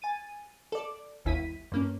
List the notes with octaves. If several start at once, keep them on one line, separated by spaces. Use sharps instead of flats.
G#5 A6 D#7
A4 D5
G1 D#2 E4 B6 D#7
G2 A#3 C#4